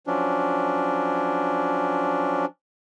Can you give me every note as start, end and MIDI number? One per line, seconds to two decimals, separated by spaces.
0.07 2.46 53
0.07 2.46 54
0.07 2.46 61
0.07 2.46 62